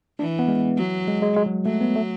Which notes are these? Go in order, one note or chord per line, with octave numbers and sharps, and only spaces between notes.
E3 D4
B3
G#3
F#3
G#3
G#3
G#3
F#3
F#3 A3
B3
A3